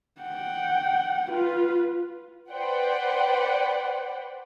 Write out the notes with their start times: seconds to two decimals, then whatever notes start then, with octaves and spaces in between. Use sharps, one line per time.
0.21 F#5 G5
1.31 F4 B4
2.51 B4 C5 D5 F#5 G5